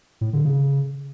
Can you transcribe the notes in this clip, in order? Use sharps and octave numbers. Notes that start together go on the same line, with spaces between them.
A2
D3
C#3